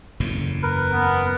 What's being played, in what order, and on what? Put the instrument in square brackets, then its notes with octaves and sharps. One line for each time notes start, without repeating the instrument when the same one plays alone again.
[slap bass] F#1 E2 A2
[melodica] A#4 B4
[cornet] B3